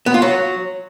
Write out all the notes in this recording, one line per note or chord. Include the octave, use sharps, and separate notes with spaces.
B3
F4
F#3